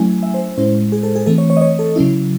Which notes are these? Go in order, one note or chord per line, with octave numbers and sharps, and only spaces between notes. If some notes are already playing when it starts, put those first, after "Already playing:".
Already playing: F#3 A3 C#4 E4 G#5
E5
C5
A2 G#3 C#4 E4 C5
G#4
A4
G#4
E3 A3 C4 A4
C#5
C#5
D#5
C#5
A4
C#3 F#3 C#4 E4